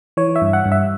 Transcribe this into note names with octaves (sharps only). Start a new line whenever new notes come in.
E3 C#5
E5
G2
F#5
G2
E5